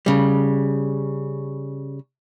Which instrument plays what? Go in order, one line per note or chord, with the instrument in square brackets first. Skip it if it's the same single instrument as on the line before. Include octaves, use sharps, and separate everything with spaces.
[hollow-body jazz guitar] C#3 G3